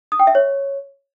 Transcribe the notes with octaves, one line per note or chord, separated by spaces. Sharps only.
D#6
G5
E5
C#5